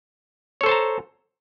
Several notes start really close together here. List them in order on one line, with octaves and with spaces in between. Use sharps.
C#5 A4 C5 A5 A#5